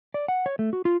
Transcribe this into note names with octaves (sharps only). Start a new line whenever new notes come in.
D5
F#5
C#5
A3
F#4
F4